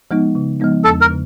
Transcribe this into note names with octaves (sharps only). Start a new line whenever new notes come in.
F3 G#3 B3 D#4
C#3
F3 G#3 B3 D#4
E2 A4
A#4
C#3